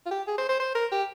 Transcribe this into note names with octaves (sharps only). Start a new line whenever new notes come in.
F4
G4
G#4
C5
C5
C5
A#4
G4